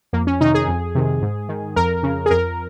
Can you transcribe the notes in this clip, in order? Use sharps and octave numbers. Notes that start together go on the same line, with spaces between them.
F2 A#3
C#4
C3 D#3 D#4
G#4
F2
C3 D#3
G#2
D#3
F2 A#4
C#3
G#4
F2 A#4